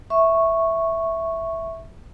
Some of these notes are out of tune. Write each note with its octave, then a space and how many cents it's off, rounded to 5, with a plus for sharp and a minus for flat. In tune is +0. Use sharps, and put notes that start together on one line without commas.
E5 +0 C#6 -5